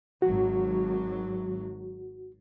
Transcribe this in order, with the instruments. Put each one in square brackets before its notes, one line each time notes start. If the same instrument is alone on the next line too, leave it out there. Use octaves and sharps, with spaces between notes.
[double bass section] G#1 F#3 [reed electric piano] F#4